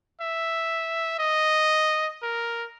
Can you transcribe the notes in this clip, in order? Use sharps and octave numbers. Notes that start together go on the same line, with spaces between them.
E5
D#5
A#4